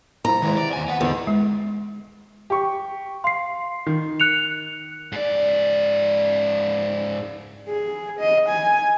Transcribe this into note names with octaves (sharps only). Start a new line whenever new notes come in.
C2 F3 A4 A#5
E2 C3 D#3 G#3
D5
D#2 G#5
B3 F#5
E2 G#2 D3 D#3
G#3
G4 C#6
F5 C6 C7
D#3
F#6 C#7 F7
G#2 D5
G#4
D#5
G#5